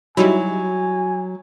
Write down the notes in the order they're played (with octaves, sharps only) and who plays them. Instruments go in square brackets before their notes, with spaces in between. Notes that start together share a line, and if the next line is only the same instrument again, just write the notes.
[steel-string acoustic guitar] F#3 [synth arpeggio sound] G3 D#4 E4 [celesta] F#4 [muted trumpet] G#5